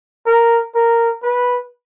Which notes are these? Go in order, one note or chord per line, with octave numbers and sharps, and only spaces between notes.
A#4
A#4
B4